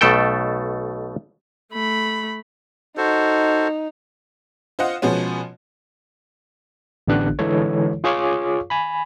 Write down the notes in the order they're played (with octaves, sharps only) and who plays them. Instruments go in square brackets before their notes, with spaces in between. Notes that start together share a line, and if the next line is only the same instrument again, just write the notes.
[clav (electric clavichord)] B1 B2 A3 A4 G5
[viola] A3 B5
[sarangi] D#4 [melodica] F#4 A4 C5
[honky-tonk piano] F4 C5 D#5 F5 F#5
B2 F3 G#3 B3 C#4
[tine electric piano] A1 D3 B3 D4 G4 F#6
D3 E3 G#3 E4 A4 C#5
F4 G#4 C#5 F5 C#6 D6
G#5 B5